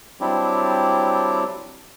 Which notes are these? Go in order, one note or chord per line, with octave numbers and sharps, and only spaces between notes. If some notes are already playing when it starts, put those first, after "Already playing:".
F#3 G3 C4 D4 E4 G4